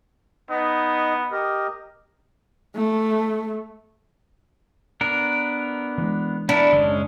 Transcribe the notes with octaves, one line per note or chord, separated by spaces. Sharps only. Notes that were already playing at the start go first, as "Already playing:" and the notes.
B3 D#4 D#5
G4 A#4 D#5
A3
B3 D4 A#4
E3 G#3
B3 D4 E4 A#4
F#1 D#3 G#3 C#4